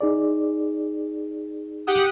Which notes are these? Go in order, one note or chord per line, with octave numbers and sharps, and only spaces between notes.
D#4 G#4 D5
G4 F#5 D#6